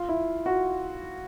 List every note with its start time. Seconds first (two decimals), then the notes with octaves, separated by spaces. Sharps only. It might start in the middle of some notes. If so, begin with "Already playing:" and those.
Already playing: F4
0.09 E4
0.46 F#4